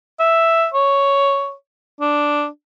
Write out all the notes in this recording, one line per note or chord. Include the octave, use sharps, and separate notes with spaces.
E5
C#5
D4